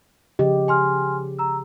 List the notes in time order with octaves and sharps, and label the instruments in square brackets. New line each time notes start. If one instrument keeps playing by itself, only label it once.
[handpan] C#3 F3 G4 [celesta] D#5
[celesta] G#5 C6 F6
A#5 E6